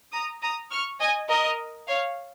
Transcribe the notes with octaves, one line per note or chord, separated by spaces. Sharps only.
A#5 D#6
A#5 D#6
C#6 F6
D#5 G#5
A#4 D#5
C#5 F5